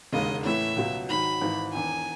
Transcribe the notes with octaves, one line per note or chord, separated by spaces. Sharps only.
E1 D#2 C#3 G#3 D#5
A2 E3 A3 C#4 E4 E5
C#2 B2 F#3
G#2 D#3 F#3 B5
G#1 G#2 E3
E1 E2 D#3 G#5